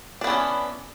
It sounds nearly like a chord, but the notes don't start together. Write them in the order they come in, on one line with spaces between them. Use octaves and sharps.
D4 B3 E3 C#4